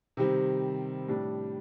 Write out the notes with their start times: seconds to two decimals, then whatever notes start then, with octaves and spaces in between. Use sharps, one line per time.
0.17 C3 D#3 G3 C4
1.08 A2 G3 D4